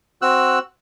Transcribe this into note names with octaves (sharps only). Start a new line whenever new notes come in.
C4 F#4 E6 F#6